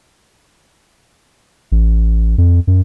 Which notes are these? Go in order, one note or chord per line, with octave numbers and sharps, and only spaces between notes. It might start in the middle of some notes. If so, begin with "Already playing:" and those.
A1
F2
F#2